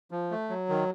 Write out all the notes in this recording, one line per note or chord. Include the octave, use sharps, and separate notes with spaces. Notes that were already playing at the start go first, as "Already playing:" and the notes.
F3
A3
F#3
D#3